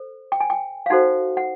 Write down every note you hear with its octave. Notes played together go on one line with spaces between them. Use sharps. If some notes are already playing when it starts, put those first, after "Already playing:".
Already playing: A4 C5
G5
G#5
G5
F5
D#4 F#4 A4 C5 F#5
F#5